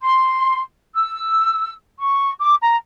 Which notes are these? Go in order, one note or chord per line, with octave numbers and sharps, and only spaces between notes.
C6
E6
C#6
D6
A#5